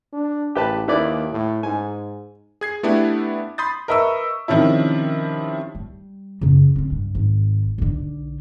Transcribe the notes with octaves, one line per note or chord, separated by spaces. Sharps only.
D4
A1 G4 B4 A5
D#2 E4 B4 D5
A2
G#2 G#5
G#4 G#6 C7
A3 B3 D4 E4 G4
B5 C6 D#6 G6 A6
A#4 B4 D#5 E5 C#6 E6
C3 D#3 F3 C#4 E4
G3
F#2 C#3
D3 C4
G2
G#1
B1 D3